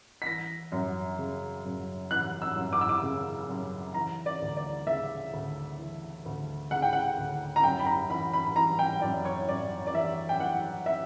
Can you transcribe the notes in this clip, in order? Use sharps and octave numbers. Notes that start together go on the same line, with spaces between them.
B6
E3 A#6
F#2
C#3
F#2
E3 F#6
E6
F#2
D6
E6
D6
C#3
F#2
E3 A#5
D5
D2
D5
C#3 E5
D2
E3
D2
C#3 F#5
G5
F#5
D2
A#5
F#2 G5
B5
A#5
E3 B5
B5
E3 A#5
G5
F#2 D5
C#5
F#2 D5
D5
E3 E5
G5
E3 F#5
E5